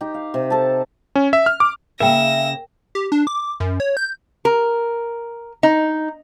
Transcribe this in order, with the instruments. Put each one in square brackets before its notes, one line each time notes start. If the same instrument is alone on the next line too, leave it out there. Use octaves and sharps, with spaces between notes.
[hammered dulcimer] D#4 G4
F5
C3
A4 A5
[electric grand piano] C#4
E5
F6
D6
[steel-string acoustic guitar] C#3 A#3 [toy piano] A#4 G5 [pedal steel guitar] E5 [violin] A#6 E7
[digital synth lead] G4
D4
D6
F#2
C#5
G6
[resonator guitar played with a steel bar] A#4
D#4